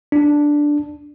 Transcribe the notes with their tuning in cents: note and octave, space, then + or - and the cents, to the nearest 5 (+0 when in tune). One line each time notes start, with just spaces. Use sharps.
D4 +0